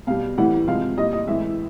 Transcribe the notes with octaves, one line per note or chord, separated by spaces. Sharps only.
B2 G3 F5
A2 E3 G3 F#5
C3 F3 G#3 F5
A#2 G3 D#5
D#5
A2 E3 G#3 E5